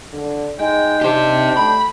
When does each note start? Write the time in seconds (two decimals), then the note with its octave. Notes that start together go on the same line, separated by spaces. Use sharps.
0.13 D3
0.59 G#3 D#4 G5
1.01 D4 G4 C5 G5
1.57 A3 B5